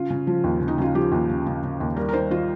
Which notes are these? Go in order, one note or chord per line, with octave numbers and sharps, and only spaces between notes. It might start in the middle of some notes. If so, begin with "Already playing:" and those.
Already playing: C#3 F4
C#3
F3
D#2
C#3
D#4
C#3 F4
F3 G4
D#2
C#3
C#3
C#3
D#2
G3 A#4
A#4
D#3 C5
D#3 F4